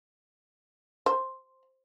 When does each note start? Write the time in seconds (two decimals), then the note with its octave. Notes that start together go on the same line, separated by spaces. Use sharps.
1.06 C5